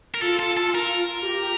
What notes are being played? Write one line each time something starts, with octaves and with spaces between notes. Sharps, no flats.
A#4
F4 A4
A4
A4
F4 A#4
G4